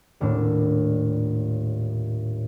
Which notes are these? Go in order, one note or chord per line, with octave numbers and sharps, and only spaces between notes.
D#1 A2 D4